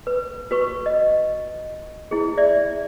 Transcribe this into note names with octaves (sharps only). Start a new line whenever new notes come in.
B4
F#4 B4 C#6
D#5
E4 G#4
D5 E5